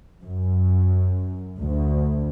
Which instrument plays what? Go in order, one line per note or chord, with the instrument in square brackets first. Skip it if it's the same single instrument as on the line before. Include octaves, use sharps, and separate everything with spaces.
[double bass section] F#2
D2